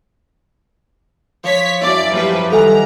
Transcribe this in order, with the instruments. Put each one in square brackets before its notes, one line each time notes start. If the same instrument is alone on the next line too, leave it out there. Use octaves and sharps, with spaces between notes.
[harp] F3 [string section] C#5 B6
[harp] F#2 D4 E4 [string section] D5
[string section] F3 G3 B4
[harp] D#3 G3 F#5 [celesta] A4 G#5 [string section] A#5